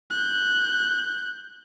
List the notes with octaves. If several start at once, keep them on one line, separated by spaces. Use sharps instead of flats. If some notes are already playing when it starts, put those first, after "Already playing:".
F#6 G6